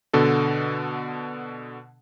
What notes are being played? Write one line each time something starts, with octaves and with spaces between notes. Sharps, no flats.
B2 D3 A4